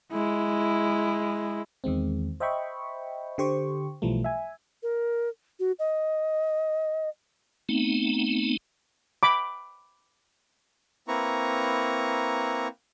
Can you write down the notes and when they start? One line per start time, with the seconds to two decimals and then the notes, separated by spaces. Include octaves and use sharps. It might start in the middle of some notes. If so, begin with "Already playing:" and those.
0.12 G#3 E4
1.84 E2 D#3 G#3 C4
2.40 C5 D#5 E5 G5 B5 C#6
3.38 D3 G4 C5 C#6
4.02 B1 E3 F3 G3 A3
4.24 E5 G#5
4.83 A#4
5.60 F#4
5.79 D#5
7.69 A3 B3 C4 D#4
9.23 B5 D6
11.08 A#3 C4 E4 B4 A#5 C#6